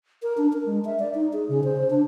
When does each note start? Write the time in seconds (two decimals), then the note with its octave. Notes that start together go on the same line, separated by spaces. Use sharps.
0.22 A#4
0.38 D4
0.53 A#4
0.66 G#3
0.85 E5
0.99 D5
1.15 D#4
1.33 G#4
1.49 C#3
1.64 C5
1.90 D4